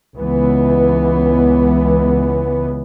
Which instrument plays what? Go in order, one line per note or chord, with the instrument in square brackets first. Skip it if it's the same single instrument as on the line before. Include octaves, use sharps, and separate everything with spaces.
[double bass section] C#2 E3 B3